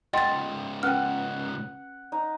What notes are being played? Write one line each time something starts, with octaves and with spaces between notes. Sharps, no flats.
C#2 G#2 D#5 F#5 G5 C6 A6
C#4 B4 F#5 G5 F6
D#4